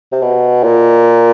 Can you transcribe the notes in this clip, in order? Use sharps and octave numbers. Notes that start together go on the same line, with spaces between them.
C3
B2
A#2